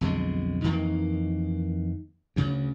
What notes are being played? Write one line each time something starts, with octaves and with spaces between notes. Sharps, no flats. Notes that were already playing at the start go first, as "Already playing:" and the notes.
B1 F2 D3 G#3
F2 D#3 E3 A#3
D2 C#3